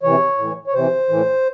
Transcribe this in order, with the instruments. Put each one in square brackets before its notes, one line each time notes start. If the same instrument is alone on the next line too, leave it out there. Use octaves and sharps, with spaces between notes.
[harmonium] C3 E3 C#5
A2 E3
C#5
C3 E3 C5
A2 E3